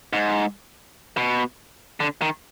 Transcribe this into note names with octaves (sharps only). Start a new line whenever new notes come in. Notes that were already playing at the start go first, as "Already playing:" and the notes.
G#2
B2
D3
D#3